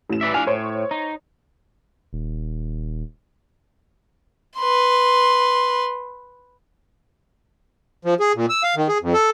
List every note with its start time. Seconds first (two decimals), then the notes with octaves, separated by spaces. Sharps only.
0.09 A1 E7
0.21 B4 D5 E5
0.34 D4 F5 G#5
0.47 A2 C5 C#5
0.91 D#4
2.13 D#1
4.57 B4 C6
8.05 F3
8.20 G#4
8.35 A#2
8.49 E6
8.63 F5
8.76 D#3
8.89 G#4
9.02 F2
9.14 A4